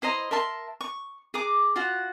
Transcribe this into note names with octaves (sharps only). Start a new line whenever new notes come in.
E4 C5 D#5 A#5
A#4 E5 A5 C6
C#6
G#4 A#5 D6
F4 F#4 F#5